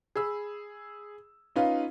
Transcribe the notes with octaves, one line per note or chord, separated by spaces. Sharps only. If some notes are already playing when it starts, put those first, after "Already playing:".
G#4 B5 E6
C#4 D#4 F4 B4 F5